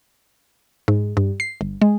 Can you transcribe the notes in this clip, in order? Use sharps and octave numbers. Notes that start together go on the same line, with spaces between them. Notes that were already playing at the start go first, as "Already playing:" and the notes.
G#2
G2
C7
G1
G#3